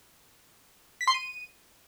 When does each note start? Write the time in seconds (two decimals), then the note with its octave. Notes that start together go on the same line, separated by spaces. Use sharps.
1.01 B6
1.07 C6
1.14 D#7